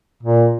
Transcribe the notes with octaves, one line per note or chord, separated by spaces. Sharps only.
A#2